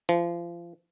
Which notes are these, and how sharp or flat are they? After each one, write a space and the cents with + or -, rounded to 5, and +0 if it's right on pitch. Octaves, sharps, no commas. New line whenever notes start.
F3 -30